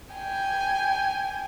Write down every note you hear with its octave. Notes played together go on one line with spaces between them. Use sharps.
G5 G#5